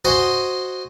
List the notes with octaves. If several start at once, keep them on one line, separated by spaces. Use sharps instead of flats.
F#4 C5 D#5 G#5 C6 C#6